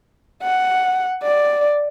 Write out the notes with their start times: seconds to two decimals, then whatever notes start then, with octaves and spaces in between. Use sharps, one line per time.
0.43 F#5
1.23 D5